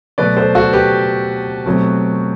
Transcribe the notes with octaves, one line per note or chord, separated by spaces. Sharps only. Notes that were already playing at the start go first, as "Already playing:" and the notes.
B2 F#3 A3 B4 D5
A4 C5
F#4 A4
G4 B4
B2 F#3 A3 C4